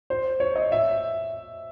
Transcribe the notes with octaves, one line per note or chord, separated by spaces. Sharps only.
C5
C#5
D#5
E5